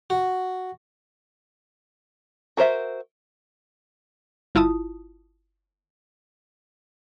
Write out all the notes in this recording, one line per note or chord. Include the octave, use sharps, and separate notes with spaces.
F#4
F#4 A#4 C5 E5
G1 E4 F4 A5 D#6